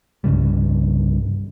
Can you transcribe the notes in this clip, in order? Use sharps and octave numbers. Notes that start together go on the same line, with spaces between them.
C2 G2 C#3 G3